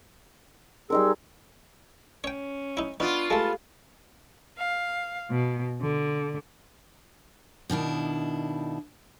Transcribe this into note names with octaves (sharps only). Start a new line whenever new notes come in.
G3 D#4 G#4 A#4 C6 E6
C#4 C#5 G5
D#4 E4
B3 D4 D#4 F4 C#6 F6 D7
G#3 A3 G4 A4 F5 A5
F5
B2
D3
B2 D#3 D4 E4